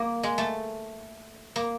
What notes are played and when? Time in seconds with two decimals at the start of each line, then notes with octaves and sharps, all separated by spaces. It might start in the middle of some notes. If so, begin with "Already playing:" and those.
Already playing: A#3
0.23 G#3
0.38 A3
1.56 A#3